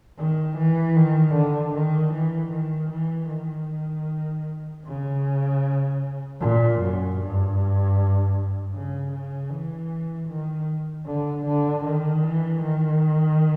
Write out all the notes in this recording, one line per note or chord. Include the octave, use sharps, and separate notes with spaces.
D#3
E3
D#3
D3
D#3
E3
D#3
E3
D#3
C#3
A#2
F#2
G2
C#3
C#3
E3
D#3
D3
D3
D#3
E3
D#3